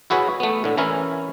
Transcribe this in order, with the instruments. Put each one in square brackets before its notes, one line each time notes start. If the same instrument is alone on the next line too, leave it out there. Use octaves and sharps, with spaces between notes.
[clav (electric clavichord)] E4 F#4 G#4 B4 C#5
A3 B3
A2 D3
E3 C#4 E4 A#4